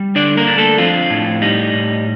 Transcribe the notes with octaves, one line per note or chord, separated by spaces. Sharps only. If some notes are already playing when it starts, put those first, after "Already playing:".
Already playing: G3
D3 D4 D5
A#3 A#4
D4
A3 A4
F3 C4 F4
A2
G3 D#4
A2